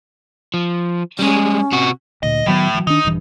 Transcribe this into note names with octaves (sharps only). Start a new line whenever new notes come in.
F3
G3 G#3 C#4
C3 F#4
D2 A#2 D#5
A2 D#3 F#3 B3
E3 F#3
D#3 D4 D#4
D#1 G2 E3